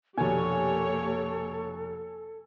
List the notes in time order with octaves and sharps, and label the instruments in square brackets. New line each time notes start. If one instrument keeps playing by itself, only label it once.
[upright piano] F1 B2 [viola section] A#3 G4 C#5 [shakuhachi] A4 [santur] G#5